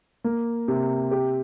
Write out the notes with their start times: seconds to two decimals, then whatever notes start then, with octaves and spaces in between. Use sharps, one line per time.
0.24 A#3
0.68 C3
1.11 G4